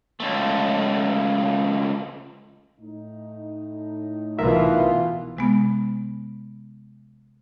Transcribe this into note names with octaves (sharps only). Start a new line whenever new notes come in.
C#2 A3
A2 D#4
C2 B2 E3 F4 A#4 E5
C3 G#3 B3